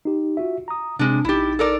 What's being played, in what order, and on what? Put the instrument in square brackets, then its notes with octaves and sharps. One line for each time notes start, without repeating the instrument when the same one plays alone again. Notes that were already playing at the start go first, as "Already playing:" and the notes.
[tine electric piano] D#4 G4
F4 F#4 E5
A#5 D#6
[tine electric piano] C3 C4 [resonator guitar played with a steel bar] G#3 D4
[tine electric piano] A#1 D#4 A6 [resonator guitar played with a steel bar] E4 G4
[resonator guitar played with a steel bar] A4 A#4 D5